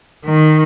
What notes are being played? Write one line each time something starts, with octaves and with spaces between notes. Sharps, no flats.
D#3